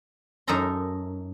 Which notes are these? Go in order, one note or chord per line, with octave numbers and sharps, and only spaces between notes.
F#2 D#4 A4 A#4 A#5 C6